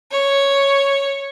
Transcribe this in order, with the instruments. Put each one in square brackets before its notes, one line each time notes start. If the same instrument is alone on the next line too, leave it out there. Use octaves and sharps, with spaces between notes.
[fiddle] C#5